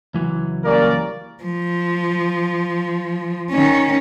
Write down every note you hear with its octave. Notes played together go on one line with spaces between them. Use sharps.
C#2 E3 F#3
G3 A#3 C#4 A#4 D5
F3
D#3 C#4